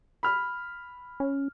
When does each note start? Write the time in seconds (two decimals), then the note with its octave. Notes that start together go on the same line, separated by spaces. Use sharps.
0.23 B5 F6
1.20 C#4